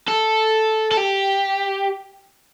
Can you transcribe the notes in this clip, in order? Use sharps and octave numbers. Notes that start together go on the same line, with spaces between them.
A4
A4
G4